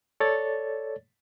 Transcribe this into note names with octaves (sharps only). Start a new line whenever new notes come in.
A4 C#5 D5 A6